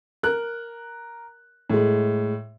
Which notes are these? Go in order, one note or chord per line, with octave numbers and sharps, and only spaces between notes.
A#4 F#6
A2 G#3